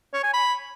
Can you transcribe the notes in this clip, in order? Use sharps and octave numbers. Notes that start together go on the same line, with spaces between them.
C#5
G#5
B5